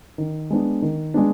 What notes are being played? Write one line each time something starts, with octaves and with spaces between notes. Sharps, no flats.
D#3
G#3 B3 D4
D#3
G#3 B3 D4